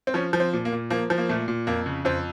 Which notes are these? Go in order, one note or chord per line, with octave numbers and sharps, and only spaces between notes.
C4
F3 C#4
F3
C4
A#2
A#3
A#2
F3 A#3
F3
A#3
A#2 A3
A#2
F2 A#3
C#3
F2 C4